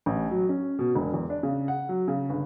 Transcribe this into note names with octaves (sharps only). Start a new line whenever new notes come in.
A1
F#3
C#4
B2
E1
E2
D4
C#3
F#5
F#3
C#3
G1